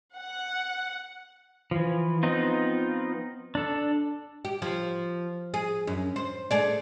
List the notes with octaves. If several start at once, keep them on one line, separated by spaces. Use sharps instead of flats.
F#5
E3 F3
F3 B3 C4 D#4 F4
D4 A4
G4
F3
G#4
F#2
C5
A3 G#4 D5